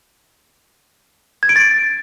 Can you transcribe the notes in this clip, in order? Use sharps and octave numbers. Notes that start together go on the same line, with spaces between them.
G#6
D7
A6